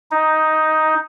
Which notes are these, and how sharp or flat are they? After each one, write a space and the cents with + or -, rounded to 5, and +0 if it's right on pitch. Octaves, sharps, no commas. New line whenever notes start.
D#4 +5